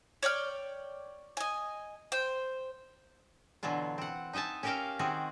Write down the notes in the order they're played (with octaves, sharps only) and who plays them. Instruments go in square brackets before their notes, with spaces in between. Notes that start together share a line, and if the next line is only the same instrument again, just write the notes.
[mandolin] C#5 D5 G5 F6
D#5 G#5
C5 G5
[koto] B2 D3 E3 F#3 F4
C4 F#5
D#4 D#5 E5 G#5 A5
C#4 G4 A#4 E5 F5 G5
D#3 C4 F#4 G#4